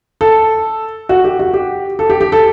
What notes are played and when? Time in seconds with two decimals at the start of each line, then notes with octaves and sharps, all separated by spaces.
0.21 A4
1.09 F#4
1.24 G4
1.39 F#4
1.54 G4
1.99 A4
2.10 G4
2.21 G4
2.32 A4